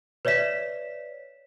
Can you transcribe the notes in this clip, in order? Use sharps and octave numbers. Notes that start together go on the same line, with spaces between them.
B4 C#5 D5 E5 B6 E7